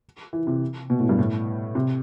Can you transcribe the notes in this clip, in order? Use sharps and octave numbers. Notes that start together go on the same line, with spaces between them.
E3
C3
B2
A2
G2
A2
C3